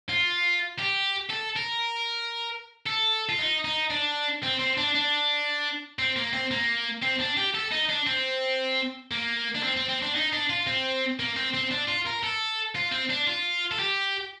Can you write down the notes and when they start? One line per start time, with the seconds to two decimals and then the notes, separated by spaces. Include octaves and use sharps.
0.09 F4
0.79 G4
1.30 A4
1.57 A#4
2.87 A4
3.29 F4
3.39 D#4
3.65 D#4
3.90 D4
4.43 C4
4.59 C4
4.78 D4
4.95 D4
5.99 C4
6.16 A#3
6.33 C4
6.51 A#3
7.03 C4
7.20 D4
7.37 G4
7.55 A4
7.72 D#4
7.89 D4
8.07 C4
9.11 A#3
9.55 D4
9.63 C4
9.76 C4
9.89 C4
10.02 D4
10.15 D#4
10.32 D4
10.50 F4
10.67 C4
11.19 A#3
11.36 C4
11.54 C4
11.71 D4
11.88 F4
12.06 A#4
12.23 A4
12.76 F4
12.92 C4
13.10 D4
13.27 F4
13.71 A4
13.79 G4